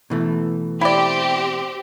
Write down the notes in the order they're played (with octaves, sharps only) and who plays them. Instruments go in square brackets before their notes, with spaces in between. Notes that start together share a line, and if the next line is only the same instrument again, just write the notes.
[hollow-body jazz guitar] B2 E3 A3
[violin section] C4 G4 [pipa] E4 D5